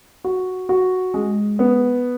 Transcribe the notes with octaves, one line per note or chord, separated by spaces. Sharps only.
F#4
F#4
G#3
B3